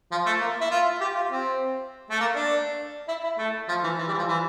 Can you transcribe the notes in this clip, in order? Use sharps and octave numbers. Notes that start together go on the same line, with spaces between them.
F3
A3
A#3
E4
F4
G4
F4
C4
A3
A#3
D4
E4
E4
A3
F3
E3
E3
G3
E3
F3
E3